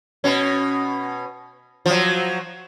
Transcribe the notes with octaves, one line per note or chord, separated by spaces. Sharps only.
B2 C#4
F3 F#3